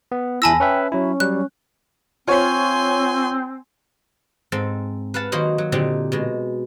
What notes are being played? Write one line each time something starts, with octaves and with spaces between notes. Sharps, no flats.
B3
E2 E4 G#5 A5 B5 E6 A#6
C#4 B4 E5 G5
F#3 C#4 E4
F#3 G3 F#6
C4 F4 C5 C#5 G#5 C6
G#2 C4 A4
B4 F5 F#5 A5
D#3 F#3 A#3 D#4 F#4 C5
F#3
A#2 D3 C4 D#4 G4
B2 G#3